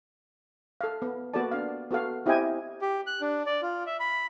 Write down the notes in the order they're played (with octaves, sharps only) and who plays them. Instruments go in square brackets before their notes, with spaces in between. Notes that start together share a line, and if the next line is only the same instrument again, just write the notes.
[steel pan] A4 F5
B3
A#3 B3 F#4 A4 D5 A5
D4 F5
B3 F#4 A4 F5
C4 E4 G4 D#5 G5 G#5
[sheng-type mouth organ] G4
F#6
D4
D5
F4
E5
B5